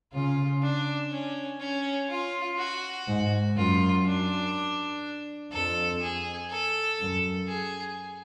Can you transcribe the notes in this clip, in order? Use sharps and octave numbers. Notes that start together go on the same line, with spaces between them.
C#3 F4
D4
C#4
C#4
F4
F#4
G#2
F#2 F4
D4
F2 A4
G#4
A4
F#2
G#4